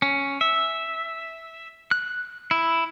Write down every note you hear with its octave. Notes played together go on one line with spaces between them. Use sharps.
C#4
E5
F#6
E4